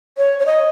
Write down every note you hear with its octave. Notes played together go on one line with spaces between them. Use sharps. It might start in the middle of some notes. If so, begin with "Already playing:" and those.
C#5
C#5
D#5